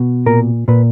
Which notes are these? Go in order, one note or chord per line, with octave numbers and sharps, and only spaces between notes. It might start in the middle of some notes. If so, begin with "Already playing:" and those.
Already playing: B2
A#2 A#4
A#2 B4